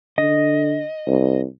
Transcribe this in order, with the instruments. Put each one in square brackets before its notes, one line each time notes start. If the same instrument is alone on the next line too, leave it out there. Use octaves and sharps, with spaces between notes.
[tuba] D3 [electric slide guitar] D#5
[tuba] C2